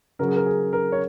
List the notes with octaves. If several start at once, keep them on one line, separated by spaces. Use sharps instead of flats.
C#3 F#3 A#4
G#4
A#4
G#4
A#4
C#5